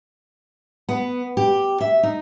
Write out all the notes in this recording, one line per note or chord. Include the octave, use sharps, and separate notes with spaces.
B3
G4
E5
D#4